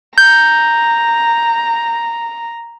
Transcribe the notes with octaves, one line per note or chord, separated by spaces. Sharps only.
A#5 G6